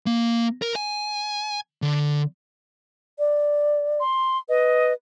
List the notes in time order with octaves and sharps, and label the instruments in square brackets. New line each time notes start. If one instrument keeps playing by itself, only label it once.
[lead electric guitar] A#3
A#4
G#5
D3
[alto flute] D5
[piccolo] C6
[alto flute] B4 [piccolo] D#5